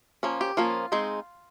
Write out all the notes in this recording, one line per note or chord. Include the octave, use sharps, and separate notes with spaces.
F3 A#3 C#4
G4
F3 A#3 C#4 F4
G#3 C4 D#4